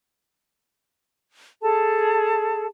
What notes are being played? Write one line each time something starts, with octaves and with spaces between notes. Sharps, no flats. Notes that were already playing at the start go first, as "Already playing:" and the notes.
G#4 A4 A5